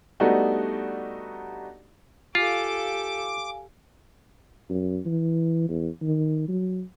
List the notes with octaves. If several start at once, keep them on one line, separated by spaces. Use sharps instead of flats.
G3 A3 B3 D4 D#4 F#4
F4 G4 A4 F5 G#5 D6
F#2
E3
E2
D#3
F#3